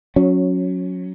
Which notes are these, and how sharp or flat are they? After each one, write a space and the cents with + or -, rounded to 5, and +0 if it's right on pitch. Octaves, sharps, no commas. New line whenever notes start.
F#3 -15 C#4 +0